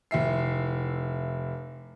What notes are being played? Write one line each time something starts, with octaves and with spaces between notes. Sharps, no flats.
F1 E4 E5 C7